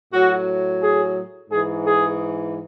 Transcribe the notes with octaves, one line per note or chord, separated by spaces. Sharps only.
A2 F#3 F#4
G#4
G#2 E3 G#4
G#4